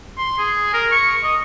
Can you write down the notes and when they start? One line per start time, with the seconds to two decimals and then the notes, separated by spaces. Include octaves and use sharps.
0.18 C6
0.39 G#4
0.74 A#4
0.91 C#6
1.23 D#5